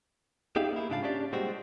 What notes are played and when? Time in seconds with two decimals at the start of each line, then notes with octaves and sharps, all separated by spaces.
0.56 B3 D#4 G4 G#4 E5 F5
0.73 A#3 E4
0.90 G#2 C#3 D4 F4 F5 A5
1.02 C#4 D4 G4 D5
1.32 A#2 G3 G#3 C4 F#4